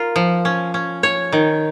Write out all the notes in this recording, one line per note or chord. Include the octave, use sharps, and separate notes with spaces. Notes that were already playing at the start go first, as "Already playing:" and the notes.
Already playing: F4 A#4
F3
C#4
C#4
C#5
D#3